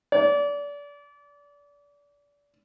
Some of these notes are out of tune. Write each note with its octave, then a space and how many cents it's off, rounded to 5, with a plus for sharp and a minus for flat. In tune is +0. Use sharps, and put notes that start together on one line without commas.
D5 -30